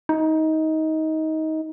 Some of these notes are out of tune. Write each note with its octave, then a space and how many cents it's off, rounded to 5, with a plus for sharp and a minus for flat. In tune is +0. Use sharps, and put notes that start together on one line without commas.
D#4 +20